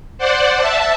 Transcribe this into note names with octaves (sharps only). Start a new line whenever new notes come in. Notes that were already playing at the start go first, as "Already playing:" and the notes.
C5 D5 F#5
E5 A5